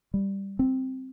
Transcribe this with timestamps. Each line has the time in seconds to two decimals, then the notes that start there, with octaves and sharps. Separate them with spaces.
0.14 G3
0.59 C4